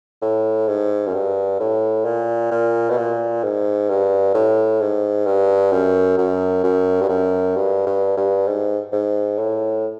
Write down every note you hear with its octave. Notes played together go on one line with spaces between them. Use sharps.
A2
G#2
F#2
G2
A2
A#2
A#2
B2
A#2
G#2
G2
A2
G#2
G2
F#2
F#2
F#2
G2
F#2
G2
G2
G2
G#2
G#2
A2